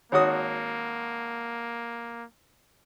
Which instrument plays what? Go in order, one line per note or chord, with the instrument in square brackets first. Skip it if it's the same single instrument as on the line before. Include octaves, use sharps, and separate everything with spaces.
[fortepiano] G#1 F#4 D#6 [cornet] A#3 [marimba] C#5